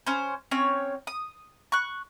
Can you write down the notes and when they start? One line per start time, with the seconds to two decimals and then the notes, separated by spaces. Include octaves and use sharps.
0.07 C#4 C5
0.51 C4 C#4 C#5
1.07 D#6
1.72 C#6 F#6